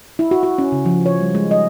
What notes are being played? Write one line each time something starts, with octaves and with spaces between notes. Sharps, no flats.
E4
F#4
F#4
C#4
C#3
F3
C#5
G3
G#3
D#5